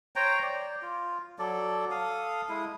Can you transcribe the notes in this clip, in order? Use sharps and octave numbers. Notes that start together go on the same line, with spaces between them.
C5 C#5 G5 A#5
D5
F4
F#3 A4 D5
A4 F5 D#6
G#3 E4 D#6